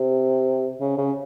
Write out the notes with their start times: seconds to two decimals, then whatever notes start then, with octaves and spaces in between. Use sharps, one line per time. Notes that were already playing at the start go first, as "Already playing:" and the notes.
Already playing: C3
0.80 C#3
0.98 C#3